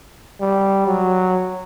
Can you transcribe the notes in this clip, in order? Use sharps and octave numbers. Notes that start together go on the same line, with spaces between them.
G3
F#3